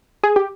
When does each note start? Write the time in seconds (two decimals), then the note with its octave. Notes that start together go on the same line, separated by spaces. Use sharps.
0.24 G#4
0.36 G4